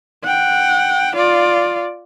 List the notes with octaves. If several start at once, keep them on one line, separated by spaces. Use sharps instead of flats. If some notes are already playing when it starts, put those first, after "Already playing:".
F#5 G5
F4 D5